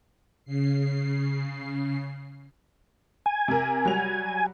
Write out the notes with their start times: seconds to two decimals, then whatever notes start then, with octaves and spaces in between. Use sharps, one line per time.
0.45 C#3 C7
3.26 G#5
3.48 C3 A#4
3.85 F#3 G3 F7